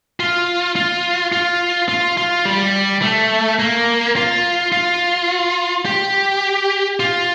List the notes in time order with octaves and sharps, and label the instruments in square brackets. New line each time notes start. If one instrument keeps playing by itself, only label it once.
[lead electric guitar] F4
F4
F4
F4
F4
G3
A3
A#3
F4
F4
G4
F4